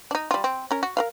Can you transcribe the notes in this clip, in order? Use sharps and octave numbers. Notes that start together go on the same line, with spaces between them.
D4 D#4
G3 F4
C4
C#4 A#4
F#4
A#4 B4 F5